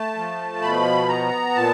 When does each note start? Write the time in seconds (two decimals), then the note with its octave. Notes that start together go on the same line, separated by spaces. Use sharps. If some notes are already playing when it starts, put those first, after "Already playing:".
Already playing: A3 A5
0.16 F3
0.62 B2 B5
1.08 B3 A#5
1.55 A#2 A5